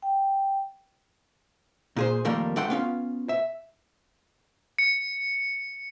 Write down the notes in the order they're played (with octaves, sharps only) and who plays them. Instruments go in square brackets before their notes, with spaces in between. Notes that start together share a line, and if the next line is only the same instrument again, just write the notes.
[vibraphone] G5
[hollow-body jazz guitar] A#2 G#4 C5
F2 D#3 G3 A3 A#3 A#4
G2 A3 D4 F#5 G5 C6
B3 C#4 F4
E5
[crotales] C#7